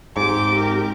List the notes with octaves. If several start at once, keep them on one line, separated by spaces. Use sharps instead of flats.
G#2 C4 G4 D6
A#4